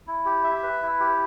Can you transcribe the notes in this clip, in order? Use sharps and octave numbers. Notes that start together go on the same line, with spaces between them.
E4
G4
E5
B4
E4
G4